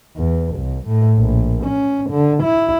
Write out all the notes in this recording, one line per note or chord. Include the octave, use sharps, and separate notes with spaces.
E2
C2
A2
A#1
C#4
D3
E4